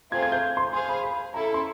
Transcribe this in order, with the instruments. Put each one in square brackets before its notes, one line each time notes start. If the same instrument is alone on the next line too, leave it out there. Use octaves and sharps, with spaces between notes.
[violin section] A3 C4 F4 G#4 C5 [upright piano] G#6
[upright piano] G#6
G6
C6
[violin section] G#4 C5 F5 G#5 [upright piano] C6
[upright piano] B5
B5
[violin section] C#4 E4 A4 [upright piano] A#5
[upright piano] B5
C6